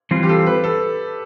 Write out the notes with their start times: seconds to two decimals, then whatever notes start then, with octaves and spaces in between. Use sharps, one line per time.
0.11 E3 G3 C4 F4
0.23 G4
0.29 A4
0.46 B4
0.64 A4